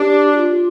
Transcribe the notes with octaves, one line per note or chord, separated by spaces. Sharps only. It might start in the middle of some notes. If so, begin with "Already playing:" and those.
Already playing: D4 G4
G4
F4